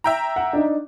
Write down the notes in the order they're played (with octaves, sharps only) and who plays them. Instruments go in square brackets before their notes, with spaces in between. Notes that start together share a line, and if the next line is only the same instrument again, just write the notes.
[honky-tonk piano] E5 G5 A#5
[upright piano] F#5
D4 D#4